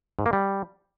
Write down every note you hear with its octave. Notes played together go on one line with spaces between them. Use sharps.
G#2
A#3
G3